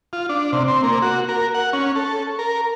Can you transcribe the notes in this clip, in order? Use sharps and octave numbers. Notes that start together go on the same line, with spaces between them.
F4
D4
C3
C4
A#3
F#4
A#4
F#5
C#4
A4
A#4